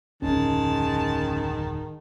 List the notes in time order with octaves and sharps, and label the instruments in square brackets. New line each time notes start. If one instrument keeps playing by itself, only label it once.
[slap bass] D1 F2 [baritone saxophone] D#3 [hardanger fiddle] G#3 A5 [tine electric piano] C#4